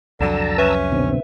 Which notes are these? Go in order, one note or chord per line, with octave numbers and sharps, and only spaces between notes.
C2 F2 D3 F#3 A5 A#5 E6
C#4 B4 E5
B2 D3 C4